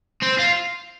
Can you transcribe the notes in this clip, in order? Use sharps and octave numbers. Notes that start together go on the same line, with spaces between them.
C4
F4